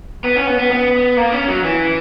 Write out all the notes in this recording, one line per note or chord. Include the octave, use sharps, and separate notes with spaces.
B3
C#4
B3
B3
B3
A#3
C#4
F#3
E3